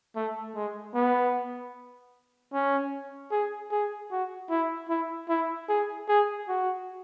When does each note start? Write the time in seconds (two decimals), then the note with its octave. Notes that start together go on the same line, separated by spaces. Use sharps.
0.16 A3
0.55 G#3
0.95 B3
2.53 C#4
3.31 G#4
3.71 G#4
4.11 F#4
4.50 E4
4.89 E4
5.29 E4
5.69 G#4
6.08 G#4
6.48 F#4